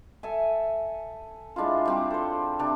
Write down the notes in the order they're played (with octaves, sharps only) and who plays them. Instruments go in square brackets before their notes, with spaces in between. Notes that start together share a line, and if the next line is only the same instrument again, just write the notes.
[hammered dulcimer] A4 E5 G#5
G#3 D4 E4 F4
G3 C4 G4
A4 C5
C3 C4 D4